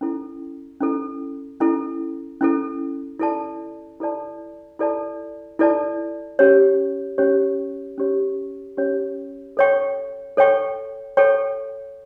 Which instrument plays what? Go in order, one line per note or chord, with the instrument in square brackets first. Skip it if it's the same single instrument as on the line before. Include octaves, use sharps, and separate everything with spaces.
[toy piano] C#4 E4 A4
C#4 E4 A4
C#4 E4 A4
C#4 E4 A4
E4 A4 D5 A5
E4 A4 D5 A5
E4 A4 D5 A5
E4 A4 D5 A5
C#4 G4 C#5
C#4 G4 C#5
C#4 G4 C#5
C#4 G4 C#5
A4 C#5 G5 C#6
A4 C#5 G5 C#6
A4 C#5 G5 C#6